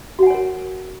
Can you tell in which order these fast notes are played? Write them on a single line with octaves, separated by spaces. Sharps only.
F#4 F#5 G#5 C#5 A#4